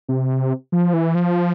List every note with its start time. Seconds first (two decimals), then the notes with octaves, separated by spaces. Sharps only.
0.09 C3
0.72 F3
0.93 E3
1.15 F3